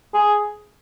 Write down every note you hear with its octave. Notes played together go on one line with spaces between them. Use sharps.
G#4